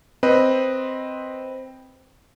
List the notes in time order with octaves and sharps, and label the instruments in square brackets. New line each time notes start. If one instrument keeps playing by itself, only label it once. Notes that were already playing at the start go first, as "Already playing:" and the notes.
[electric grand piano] C4 B4 D#5